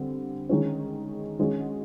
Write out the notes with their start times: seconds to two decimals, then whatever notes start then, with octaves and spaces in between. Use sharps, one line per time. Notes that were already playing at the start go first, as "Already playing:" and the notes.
Already playing: D3 G3 C4
0.49 D#3 G#3 C#4
1.39 D#3 G#3 C#4 F#4